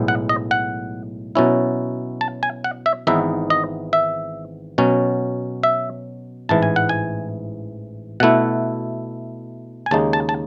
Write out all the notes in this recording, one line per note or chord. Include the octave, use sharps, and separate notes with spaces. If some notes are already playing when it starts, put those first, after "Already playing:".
Already playing: B1 A2 G#3 B3
F#5
D#5
F#5
B2 F#3 C#4 E4
A5
G#5
F#5
E5
G#1 G#2 E3 B3 D#4 E5
D#5
E5
B2 F#3 C#4
E5
A1 G#2 E3 A5
G#5
F#5
G#5
B2 A3 E4 F#5
G#5
D#2 C#3 G#3 D#4 A5
A5
A5